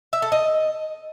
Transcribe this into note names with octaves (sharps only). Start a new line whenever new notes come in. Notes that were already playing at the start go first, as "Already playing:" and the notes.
E5
A4
D#5